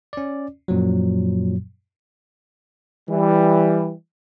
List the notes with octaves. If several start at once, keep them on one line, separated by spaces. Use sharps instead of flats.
C#4 D5
F#2 A#2 F3 F#3
E3 G3